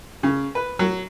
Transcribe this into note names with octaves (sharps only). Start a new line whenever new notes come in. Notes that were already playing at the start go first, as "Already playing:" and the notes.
C#3
B4
F#3